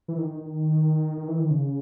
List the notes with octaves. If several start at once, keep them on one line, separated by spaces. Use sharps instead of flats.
E3
D#3
D#3
D#3
D#3
E3
D#3
C#3